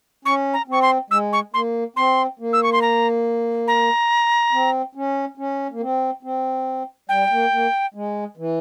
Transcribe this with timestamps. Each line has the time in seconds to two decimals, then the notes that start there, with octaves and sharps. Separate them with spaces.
0.25 C#4 C#6
0.54 A#5
0.68 C4 C#6
0.82 C6
1.10 G#3 E6
1.33 C#6
1.54 A#3 C6
1.96 C4 C6
2.39 A#3
2.53 E6
2.63 C#6
2.73 C6
2.82 A#5
3.68 A#5
4.52 C4
4.95 C#4
5.38 C#4
5.72 A#3
5.80 C4
6.23 C4
7.09 G3 G5
7.31 A#3
7.52 A#3
7.94 G#3
8.37 E3